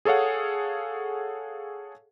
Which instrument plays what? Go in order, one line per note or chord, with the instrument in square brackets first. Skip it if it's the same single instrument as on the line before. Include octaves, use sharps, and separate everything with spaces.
[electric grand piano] G#4 A4 C#5 F5 F#5